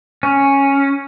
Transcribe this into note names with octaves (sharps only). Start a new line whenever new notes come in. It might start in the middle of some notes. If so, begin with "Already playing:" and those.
C#4